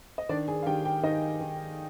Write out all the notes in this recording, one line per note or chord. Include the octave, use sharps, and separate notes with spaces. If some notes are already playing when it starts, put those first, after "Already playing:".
D#5
D#3 D4 D5
G#4 G#5
F5
D#3 G4 G5
G4 G5
D#3 D#4 D#5
D#3